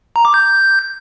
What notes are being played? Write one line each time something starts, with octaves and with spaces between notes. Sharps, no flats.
A#5
D6
G6